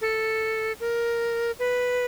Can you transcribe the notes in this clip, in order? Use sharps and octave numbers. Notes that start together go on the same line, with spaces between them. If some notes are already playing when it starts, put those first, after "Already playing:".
A4
A#4
B4